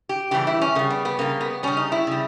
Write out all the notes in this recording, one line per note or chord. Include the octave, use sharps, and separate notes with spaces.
G4
C#3 E3 G3 G4
E4
C#4
C#3 G3 A#3
B3
B3
C#3 G3 A#3
B3
C#3 G3 C#4
D#4
E4
C#3 G3